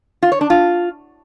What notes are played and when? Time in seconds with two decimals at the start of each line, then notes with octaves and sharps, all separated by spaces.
0.23 F4
0.32 C#5
0.41 D4
0.50 F4